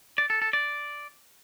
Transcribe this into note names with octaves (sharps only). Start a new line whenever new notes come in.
D5
A4
A4
D5